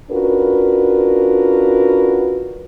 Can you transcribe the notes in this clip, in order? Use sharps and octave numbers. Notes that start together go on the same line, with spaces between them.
C#4 D4 F4 F#4 A#4 B4